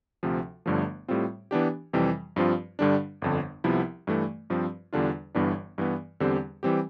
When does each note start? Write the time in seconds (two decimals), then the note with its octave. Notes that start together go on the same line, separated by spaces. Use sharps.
0.23 D2 C3 F3
0.66 G1 G2 D3 F3 A3
1.08 A2 G3 C4 F4
1.51 E3 B3 D4 G4
1.93 F2 C3 E3 G3
2.36 G2 F3 C4 F4
2.79 G2 D3 G3 D4
3.22 G1 F2 D3
3.64 C2 C3 F3 B3 E4
4.07 G2 E3 A3
4.50 G2 F3 C4
4.93 E2 D3 G3 D4 F4
5.35 G1 G2 E3 B3 D4
5.78 G2 E3 B3
6.20 E2 D3 G3 C4 G4
6.63 E3 G3 C4 G4